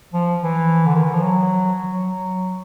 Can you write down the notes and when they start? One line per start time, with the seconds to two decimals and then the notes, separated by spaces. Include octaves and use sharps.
0.13 F3
0.43 E3
0.86 D3
0.95 D#3
1.04 E3
1.14 F3
1.23 F#3
1.92 F#3